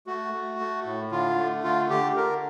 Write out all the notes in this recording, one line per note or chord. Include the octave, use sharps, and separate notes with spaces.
A3 F#4
A3
A3
A2
D3 F4
A3
D3 F4
D3 G4
D3 A#4